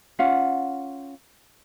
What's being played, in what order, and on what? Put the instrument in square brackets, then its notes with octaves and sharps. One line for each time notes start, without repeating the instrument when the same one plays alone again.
[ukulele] C#4 F4 F5 F#5